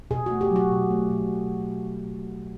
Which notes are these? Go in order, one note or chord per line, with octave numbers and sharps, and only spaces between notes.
B2 G#4
A3 F#4
G4
F#3
F#4
B2
A3
B2